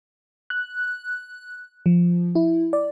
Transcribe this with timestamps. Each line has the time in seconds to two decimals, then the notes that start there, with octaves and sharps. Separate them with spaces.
0.50 F#6
1.86 F3
2.35 E4
2.73 D5